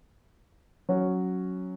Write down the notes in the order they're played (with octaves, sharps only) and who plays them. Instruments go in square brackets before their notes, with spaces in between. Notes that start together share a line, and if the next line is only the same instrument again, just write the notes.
[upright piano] F#3 C#4 F#4